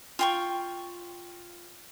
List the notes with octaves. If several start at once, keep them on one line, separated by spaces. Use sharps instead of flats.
F4 G5 C#6